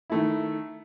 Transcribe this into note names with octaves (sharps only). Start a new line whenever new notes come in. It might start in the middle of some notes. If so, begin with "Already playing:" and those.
D#3 A3 E4